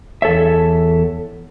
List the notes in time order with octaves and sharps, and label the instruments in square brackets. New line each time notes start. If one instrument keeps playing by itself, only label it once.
[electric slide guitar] E2 A4 C#5 E5